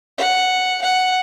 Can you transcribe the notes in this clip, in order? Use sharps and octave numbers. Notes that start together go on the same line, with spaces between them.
F#5
F#5